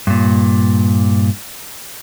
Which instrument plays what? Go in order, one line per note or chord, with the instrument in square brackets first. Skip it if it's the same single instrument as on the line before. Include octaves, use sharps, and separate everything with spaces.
[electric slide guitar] G2 A#2